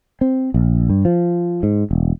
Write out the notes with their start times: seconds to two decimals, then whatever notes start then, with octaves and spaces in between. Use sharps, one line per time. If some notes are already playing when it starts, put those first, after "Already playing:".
0.21 C4
0.54 A#1
0.90 G2
1.05 F3
1.63 G#2
1.91 E1